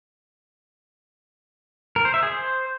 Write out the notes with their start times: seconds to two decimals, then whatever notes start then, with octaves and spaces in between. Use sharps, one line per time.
1.96 A#4
2.05 C5
2.14 E5
2.23 G#4
2.32 C5